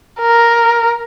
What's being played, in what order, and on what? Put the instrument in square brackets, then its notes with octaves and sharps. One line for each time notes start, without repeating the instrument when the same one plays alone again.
[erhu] A#4